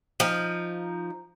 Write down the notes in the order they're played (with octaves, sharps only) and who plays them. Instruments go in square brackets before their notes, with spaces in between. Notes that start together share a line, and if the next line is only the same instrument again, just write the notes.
[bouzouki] F3 D#4